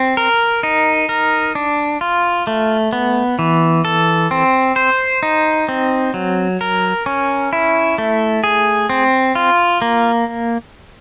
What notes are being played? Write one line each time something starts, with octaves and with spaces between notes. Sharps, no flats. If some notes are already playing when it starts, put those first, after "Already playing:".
Already playing: C4
A#4
D#4
A#4
D4
F4
A3
B3
E3
A4
C4
C5
D#4
C4
F#3
A#4
C#4
E4
A3
G#4
C4
F4
A#3